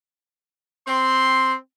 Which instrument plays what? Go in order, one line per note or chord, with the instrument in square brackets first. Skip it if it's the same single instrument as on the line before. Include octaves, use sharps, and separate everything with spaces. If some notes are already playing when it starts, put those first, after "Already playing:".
[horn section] C4 C6